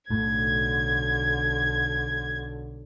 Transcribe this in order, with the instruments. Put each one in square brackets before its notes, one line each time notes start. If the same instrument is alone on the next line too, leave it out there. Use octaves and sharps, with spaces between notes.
[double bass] B1 D3 [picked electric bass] A2 [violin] G#6